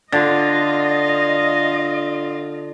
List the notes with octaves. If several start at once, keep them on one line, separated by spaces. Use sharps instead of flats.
D3 F4 D#5